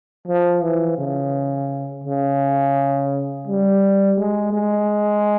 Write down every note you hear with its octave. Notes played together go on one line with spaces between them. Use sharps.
F3
E3
C#3
C#3
G3
G#3
G#3